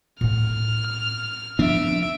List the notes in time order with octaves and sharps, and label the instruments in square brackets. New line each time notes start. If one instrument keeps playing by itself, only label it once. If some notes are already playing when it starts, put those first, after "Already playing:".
[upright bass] A2 C4 [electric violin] F6
[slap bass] F3 B3 D4 [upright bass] C4 [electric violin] E5 D7